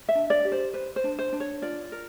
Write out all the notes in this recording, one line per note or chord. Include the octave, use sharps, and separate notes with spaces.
E5
D4
D5
G4
C5
B4 C5
C5
D4
C5
D4
C#5
F4 D5
A#4